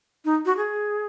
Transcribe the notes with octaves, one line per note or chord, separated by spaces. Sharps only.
D#4
F#4
G#4